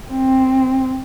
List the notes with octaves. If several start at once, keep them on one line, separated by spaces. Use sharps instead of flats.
C4